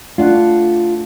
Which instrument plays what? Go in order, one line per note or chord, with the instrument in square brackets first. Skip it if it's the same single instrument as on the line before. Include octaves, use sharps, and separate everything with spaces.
[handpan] A3 D4 F#5 [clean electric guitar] F4